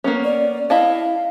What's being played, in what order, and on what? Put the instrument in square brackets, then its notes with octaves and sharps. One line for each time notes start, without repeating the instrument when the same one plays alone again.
[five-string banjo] A#3 B3 C#4
[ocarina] D5
[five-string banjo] E4 D#5 A5 [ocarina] F5